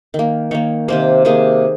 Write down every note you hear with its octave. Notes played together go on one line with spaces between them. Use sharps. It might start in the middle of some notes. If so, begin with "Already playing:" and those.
D#3
A#3
D#3 A#3 C#5
C3 D#3 A#3 C5
C3 D#3 A#3 G#4